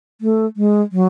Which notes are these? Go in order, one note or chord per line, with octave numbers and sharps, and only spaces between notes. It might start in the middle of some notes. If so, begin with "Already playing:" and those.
A3
G#3
F#3